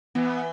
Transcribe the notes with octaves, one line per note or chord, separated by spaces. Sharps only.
E3 B3